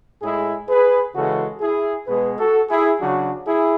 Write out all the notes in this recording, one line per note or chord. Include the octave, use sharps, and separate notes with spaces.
A2 G#3 E4 G#4
G#4 B4
C#3 E3 G#3 F#4 A4
E4 G#4
B2 G#3 G#4 B4
F#4 A4
E4 G#4
C#3 F#3 D4 F#4
E4 G#4